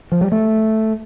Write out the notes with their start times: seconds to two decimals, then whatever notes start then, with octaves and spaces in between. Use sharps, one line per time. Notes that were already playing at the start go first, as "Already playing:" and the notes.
0.12 F3
0.21 G3
0.32 A3